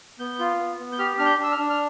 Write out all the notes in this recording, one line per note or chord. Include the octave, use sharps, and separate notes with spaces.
B3 G6
F4
B3
B3
G6
G4 F6
D4 F6
G6
D4 E6
F6
D4
F6